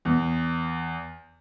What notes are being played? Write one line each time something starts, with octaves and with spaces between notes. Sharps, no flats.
E2